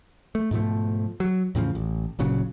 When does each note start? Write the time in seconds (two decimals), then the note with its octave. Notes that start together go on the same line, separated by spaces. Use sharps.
0.35 A3
0.51 G#2 B2 F3 A3
1.20 F#3
1.55 E2 A2 C#3 F3
1.75 A1
2.19 G1 A#2 C#3 F#3